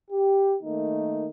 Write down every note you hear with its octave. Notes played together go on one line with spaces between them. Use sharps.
G4
D#3 A3 A#3 D#4